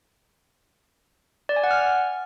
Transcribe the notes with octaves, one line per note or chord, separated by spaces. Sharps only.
D5
G#5
F#5
F6